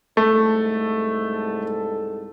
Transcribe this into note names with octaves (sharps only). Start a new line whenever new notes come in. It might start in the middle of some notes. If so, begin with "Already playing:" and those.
C2 G#2 A3 A4